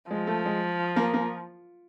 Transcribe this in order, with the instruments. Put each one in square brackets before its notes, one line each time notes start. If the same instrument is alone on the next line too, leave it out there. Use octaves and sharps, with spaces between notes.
[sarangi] F3 [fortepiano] G#3
[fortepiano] A3
G#3
A#3
A#3